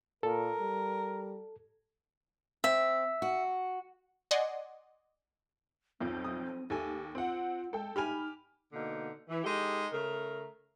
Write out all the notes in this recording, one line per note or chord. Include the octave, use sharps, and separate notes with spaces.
A#2 A4 A#4
G3
C4 E5
F#4
D5 D#5 F#5 G#5 C6
B1 F2 F3 C4
D#6
D#2 G4 A4 G#5
C4 F4 F#5
G#3 A4 G5
D#4 G4 G#5 B5 F6 F7
B2 D3 A#3 D#4
E3
G#3 D#4 G4 A4
C#3 A3 A#4